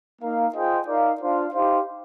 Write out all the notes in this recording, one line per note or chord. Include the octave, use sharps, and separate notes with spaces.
A#3 D#4 A#4 F5
F4 G#4 C5 D#5 G5
D#4 A#4 D5 F5
D4 F4 C5 F5
D#4 G4 C5 F5